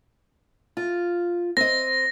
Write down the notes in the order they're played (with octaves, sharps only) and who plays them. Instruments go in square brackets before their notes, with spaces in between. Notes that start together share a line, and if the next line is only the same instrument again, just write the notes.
[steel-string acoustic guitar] F4
[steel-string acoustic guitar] C4 D#5 [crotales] A#6